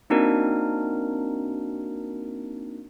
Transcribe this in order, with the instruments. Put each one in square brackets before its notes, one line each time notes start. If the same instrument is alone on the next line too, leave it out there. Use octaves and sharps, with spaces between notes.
[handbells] A#3 C4 D4 D#4 F#4 A#4